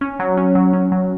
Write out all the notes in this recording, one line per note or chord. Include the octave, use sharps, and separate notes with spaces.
C#4
F#3
C#4
F#3
C#4
F#3